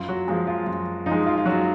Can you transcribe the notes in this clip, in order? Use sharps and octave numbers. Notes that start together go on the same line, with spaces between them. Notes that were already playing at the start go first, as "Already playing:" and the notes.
Already playing: F#2 F4
F#3 F#4
F3 G#3
F4
F#2 F4
F3 D#4
G#3
F4
F4
F#2 F#3 F#4